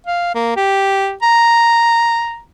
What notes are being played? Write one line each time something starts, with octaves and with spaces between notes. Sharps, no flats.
F5
A#3
G4
A#5